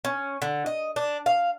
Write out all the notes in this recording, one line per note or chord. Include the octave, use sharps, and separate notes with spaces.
C#4
D3
D#5
D4
F5